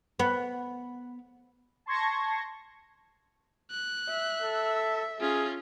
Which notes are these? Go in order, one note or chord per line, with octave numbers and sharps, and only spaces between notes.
B3
A5 C6 C#6 G#6 A#6
F#6
E5
A4
C#4 F4 G#4